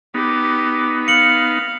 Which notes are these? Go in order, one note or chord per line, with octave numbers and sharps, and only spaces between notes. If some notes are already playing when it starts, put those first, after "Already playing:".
B3 D#4 G4
F5 C#7 F#7